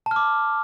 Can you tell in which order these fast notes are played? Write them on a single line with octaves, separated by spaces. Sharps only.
A5 F6 D6